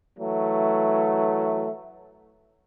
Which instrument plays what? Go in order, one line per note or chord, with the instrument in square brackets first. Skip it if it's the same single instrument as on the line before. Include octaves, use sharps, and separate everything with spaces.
[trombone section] E3 F#3 A3